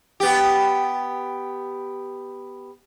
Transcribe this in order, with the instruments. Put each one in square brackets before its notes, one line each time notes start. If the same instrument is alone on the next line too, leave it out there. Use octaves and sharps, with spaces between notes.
[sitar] B3 G4